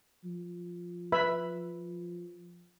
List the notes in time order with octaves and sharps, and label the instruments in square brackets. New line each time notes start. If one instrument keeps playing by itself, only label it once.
[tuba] F3
[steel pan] B4 E5 B5